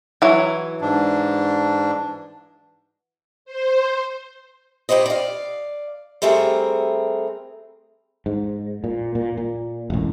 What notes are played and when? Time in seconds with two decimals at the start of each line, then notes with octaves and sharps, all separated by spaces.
0.22 E3 F#3
0.81 G#2 D4
3.45 C5
4.89 G2 B3 G4 C5 D#5
5.06 D5 F5
6.22 G3 A3 C4 G#4 A#4
8.26 G#2
8.84 A#2
9.15 A#2
9.38 A#2
9.90 E1 A1